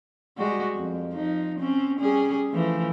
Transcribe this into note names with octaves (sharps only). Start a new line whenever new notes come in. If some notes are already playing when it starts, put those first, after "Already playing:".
G3 G#3 F#4
F2
F3 D#4
C4 C#4
G3 C#4 G#4
E3 F3 A3